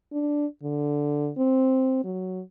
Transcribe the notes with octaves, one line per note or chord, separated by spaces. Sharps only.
D4
D3
C4
F#3